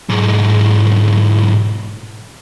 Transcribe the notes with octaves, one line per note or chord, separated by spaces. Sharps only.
B1 G#2